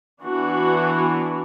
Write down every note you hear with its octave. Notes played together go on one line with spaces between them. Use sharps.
E3 B3 D4 F#4